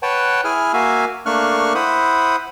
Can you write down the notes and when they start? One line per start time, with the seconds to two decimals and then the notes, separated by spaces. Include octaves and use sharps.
0.02 B4 C#5 F#5 G5 A5
0.44 E4 G#4 G#5 F6
0.73 A#3 F#4 E5 F5 G#5
1.26 A3 A#3 D4 C#6 F6 F#6
1.75 E4 C5 F#5 B5 D#6